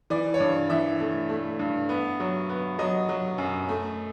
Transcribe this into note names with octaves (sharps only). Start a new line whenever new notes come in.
E3 D5
C#5
G2 D5
E3 E5
A3
A3
G2
B3
F#3
B3
F#3 D#5
F#3
F#2
A3